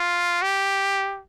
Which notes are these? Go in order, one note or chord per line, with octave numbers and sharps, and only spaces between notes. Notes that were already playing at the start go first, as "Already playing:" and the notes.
Already playing: F4
G4